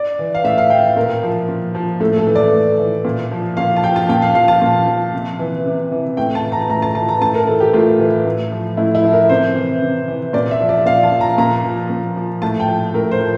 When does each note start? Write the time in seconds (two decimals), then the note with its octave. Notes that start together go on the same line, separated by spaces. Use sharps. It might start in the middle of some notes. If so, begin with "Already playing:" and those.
Already playing: D5
0.19 E3
0.34 F5
0.44 A2 E5
0.58 F5
0.70 E3 G5
0.96 A#2 A#4
1.23 F3
1.48 A#2
1.75 F3
2.00 A2 A4
2.18 A4
2.27 E3
2.35 D5
2.53 A2
2.79 E3
3.05 A#2
3.32 F3
3.57 A#2 F5
3.76 A5
3.84 F3 G5
3.96 A5
4.09 A#2 G5
4.22 F5
4.35 F3 F5
4.48 A5
4.61 A#2
4.87 F3
5.14 C3
5.39 E3
5.66 C3
5.92 E3
6.17 A2 G5
6.35 A5
6.43 E3
6.52 A#5
6.70 A2 A#5
6.82 A5
6.95 E3 A5
7.09 A#5
7.22 A2 A5
7.35 A#4
7.47 E3 A4
7.60 G4
7.73 A2 F4
8.00 E3
8.25 A2
8.52 F3
8.77 A2 E4
8.95 E4
9.04 F3
9.12 A#4
9.29 C3 C5
9.56 E3
9.82 C3
10.08 E3
10.33 A#2 D5
10.51 E5
10.60 F3
10.69 D5
10.86 A#2 F5
11.03 A5
11.12 F3
11.21 A#5
11.38 A#2 A#5
11.64 F3
11.90 A#2
12.16 F3
12.42 A2 A5
12.60 G5
12.68 F3
12.94 A2 A#4
13.11 C5
13.20 F3